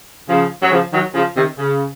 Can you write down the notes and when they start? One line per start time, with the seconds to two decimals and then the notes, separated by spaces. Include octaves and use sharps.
0.28 C#3 F3
0.61 F#3
0.71 C#3 F3
0.93 D#3 F#3
1.15 C#3 F3
1.36 C3 D#3
1.58 C#3